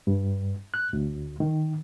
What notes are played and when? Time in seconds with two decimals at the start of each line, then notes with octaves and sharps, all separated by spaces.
0.07 G2
0.74 F#6
0.93 D2
1.40 D#3